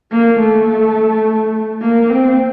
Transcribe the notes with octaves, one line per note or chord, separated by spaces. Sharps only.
A#3
A3
A#3
C4